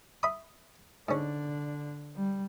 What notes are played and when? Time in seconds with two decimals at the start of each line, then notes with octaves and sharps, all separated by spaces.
0.23 E5 B5 D#6
1.09 G#2 D3 C#4 D4
2.16 G3